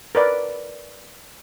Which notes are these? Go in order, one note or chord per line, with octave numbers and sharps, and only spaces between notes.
A#4 B4 D5